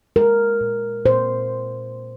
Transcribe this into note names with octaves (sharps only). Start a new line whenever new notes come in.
G#3 A#4
A#2
A#2 C5